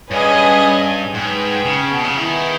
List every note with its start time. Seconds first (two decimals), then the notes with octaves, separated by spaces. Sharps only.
0.10 G2 C#4 G#4 B4 D#5 G#5
1.13 G#2 G#4 B4 G5
1.65 C#3
1.91 B2
2.04 C#3
2.17 D#3 B3 E4 G#4